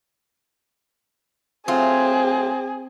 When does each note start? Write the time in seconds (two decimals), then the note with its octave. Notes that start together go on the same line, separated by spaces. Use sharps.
1.68 F#3 A3 C4 F4 G#4